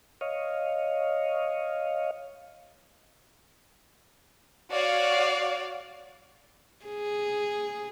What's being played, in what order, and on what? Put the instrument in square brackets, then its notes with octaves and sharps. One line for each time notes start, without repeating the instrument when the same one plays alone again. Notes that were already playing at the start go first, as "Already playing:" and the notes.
[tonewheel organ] C#5 D#5 F5
[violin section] F#4 C#5 F5 [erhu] D5
[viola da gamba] G#4